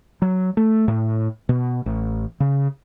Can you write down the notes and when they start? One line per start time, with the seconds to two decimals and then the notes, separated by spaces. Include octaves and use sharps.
0.22 F#3
0.57 A3
0.88 A2
1.49 B2
1.86 A1
2.40 C#3